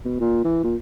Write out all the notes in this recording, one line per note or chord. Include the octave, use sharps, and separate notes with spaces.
B2
A#2
E3
A#2